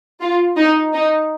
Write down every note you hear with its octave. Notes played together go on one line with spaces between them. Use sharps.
F4
D#4
D#4